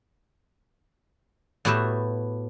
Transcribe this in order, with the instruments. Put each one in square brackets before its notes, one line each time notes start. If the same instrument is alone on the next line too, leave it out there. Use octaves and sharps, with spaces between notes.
[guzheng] A2 B3 F#4 G4 B4 E5